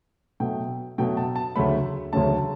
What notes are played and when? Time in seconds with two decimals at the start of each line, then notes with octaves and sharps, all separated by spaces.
0.40 B2 F#3 A3 G5
0.98 B2 F#3 A3 G5
1.17 A5
1.36 A5
1.56 D2 C#3 F#3 A3 C#4 B5
2.13 D2 C#3 F#3 A3 C#4 A5